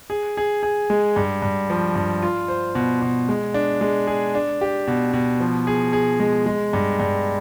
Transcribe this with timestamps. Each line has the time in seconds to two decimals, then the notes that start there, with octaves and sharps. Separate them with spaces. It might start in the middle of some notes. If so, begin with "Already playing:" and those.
0.10 G#4
0.37 G#4
0.63 G#4
0.90 G#3
1.16 G2
1.42 G2
1.70 F3
1.95 G2
2.23 F4
2.48 C5
2.75 B2
3.02 B2
3.29 G#3
3.54 D4
3.81 G#3
4.07 G#4
4.35 D4
4.61 G4
4.88 B2
5.13 B2
5.40 F3
5.67 G#4
5.93 G#4
6.20 G#3
6.46 G#3
6.73 G2
7.00 G2